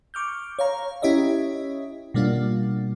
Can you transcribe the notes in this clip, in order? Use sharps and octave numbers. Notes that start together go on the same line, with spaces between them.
C#6 D6 F6 G6
C#5 F5 A#5 C#6
C#4 E4 G4 C#5 D#5 E5
B2 G3 A#3 D4 F4